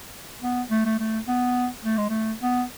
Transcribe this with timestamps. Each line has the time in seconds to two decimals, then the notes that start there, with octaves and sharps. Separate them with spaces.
0.42 B3
0.70 A3
0.85 A3
0.99 A3
1.28 B3
1.85 A3
1.97 G#3
2.09 A3
2.42 B3